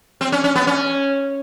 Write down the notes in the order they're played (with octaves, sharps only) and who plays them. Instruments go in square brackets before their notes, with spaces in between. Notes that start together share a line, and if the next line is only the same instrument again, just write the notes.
[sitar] C4
C#4
C#4
B3
C#4